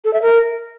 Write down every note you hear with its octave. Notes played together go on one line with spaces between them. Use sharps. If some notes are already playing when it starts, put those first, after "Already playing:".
A4
E5
A#4